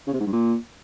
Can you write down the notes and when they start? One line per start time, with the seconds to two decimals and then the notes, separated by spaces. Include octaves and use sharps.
0.07 C#3
0.14 C3
0.20 G#2
0.26 G2
0.33 A#2